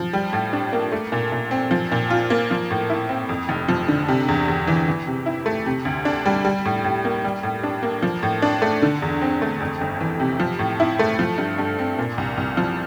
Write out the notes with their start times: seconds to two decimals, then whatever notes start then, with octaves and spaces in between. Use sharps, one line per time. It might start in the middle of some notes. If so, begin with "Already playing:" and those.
Already playing: F3
0.13 G3
0.33 A2
0.53 D4
0.73 A#3
0.92 A3
1.12 A#2
1.32 A#2
1.51 C4
1.71 F3
1.92 A#2
2.10 F4
2.30 A#3
2.51 F3
2.70 A2
2.90 E4
3.09 C4
3.29 F2
3.49 F1
3.68 F3
3.88 D3
4.08 C3
4.28 E2
4.48 E2
4.67 E3
4.88 E3
5.07 C3
5.26 E4
5.46 A3
5.66 C3
5.85 D2
6.05 D4
6.26 G3
6.45 G3
6.65 A2
6.84 A2
7.05 A#3
7.24 G3
7.43 A2
7.63 D4
7.83 A#3
8.02 F3
8.23 A2
8.42 D4
8.62 A3
8.82 D3
9.02 E2
9.22 C4
9.42 A3
9.61 F2
9.81 G1
10.00 E3
10.20 C3
10.40 F3
10.59 A2
10.80 E4
10.99 A3
11.19 F3
11.38 G2
11.59 G2
11.79 C4
11.98 A#2
12.18 C2
12.37 C2
12.57 F3